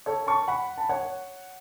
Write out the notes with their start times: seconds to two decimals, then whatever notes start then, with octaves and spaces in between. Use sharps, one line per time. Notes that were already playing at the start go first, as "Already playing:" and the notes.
0.06 A4 C#5
0.27 A5 C#6
0.48 F#5 B5
0.78 A5
0.89 C#5 F#5